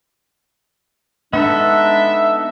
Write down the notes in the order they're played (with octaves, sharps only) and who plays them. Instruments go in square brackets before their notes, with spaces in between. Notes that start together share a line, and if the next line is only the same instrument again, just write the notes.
[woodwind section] G#3 D4 [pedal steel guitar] B3 D#4 A4 [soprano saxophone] E5